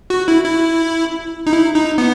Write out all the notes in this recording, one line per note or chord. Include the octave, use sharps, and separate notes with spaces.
F#4
E4
E4
D#4
E4
D#4
B3